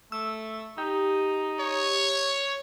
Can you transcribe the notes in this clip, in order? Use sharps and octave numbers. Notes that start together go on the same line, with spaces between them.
A3 E6
D#4 G4
C#5